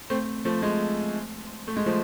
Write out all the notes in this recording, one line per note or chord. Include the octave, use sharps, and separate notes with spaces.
A3 C4
F3 A3
G#3
A3
G#3
F3 A3